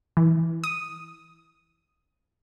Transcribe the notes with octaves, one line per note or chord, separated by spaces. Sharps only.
E3
D#6